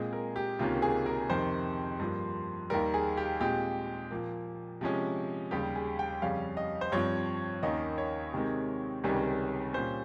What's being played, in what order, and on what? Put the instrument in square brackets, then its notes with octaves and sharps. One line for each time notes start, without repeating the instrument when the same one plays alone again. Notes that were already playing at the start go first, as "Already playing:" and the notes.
Already playing: [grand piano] A#2 G#3 C4 G#4
A#4
G4
C#2 C3 D#3 A#3 C#4 F4
G#4
A#4
F2 C3 D#3 C5
G2 F3 A#3
D#2 D#3 G3 A#4
G#4
G4
A#2 G#3 C4 G4
A#2 F3 A#3
C3 F3 G#3 C#4
D#2 C#3 G3 G4
G#4
G5
F2 C#3 G3 C#4 F5
D#5
C5
G2 F3 C4 C#5
D#2 D#3 A#3 C#4 D#5
C#5
C3 D#3 G#3 C4
C#2 C3 D#3 G3 C#4
A#2 G3 C#4 C5